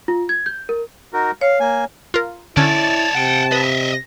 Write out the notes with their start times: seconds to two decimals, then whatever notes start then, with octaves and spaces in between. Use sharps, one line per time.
0.08 F4
0.29 G#6
0.46 G6
0.69 A#4
1.13 D#4 F#4 A#4
1.41 C#5 F5
1.60 A#3 G#5
2.14 F4 A#4
2.57 D3 C#4 E4 C#5 D5 A5
3.15 C3 F#5 G5
3.52 B4 D#5 E5